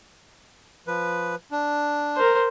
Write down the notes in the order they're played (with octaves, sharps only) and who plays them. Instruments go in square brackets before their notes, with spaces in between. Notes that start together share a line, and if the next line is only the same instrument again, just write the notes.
[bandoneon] F3 B4
D4
[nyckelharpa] A#4 C5